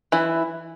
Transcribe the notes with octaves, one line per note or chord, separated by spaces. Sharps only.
E3 E4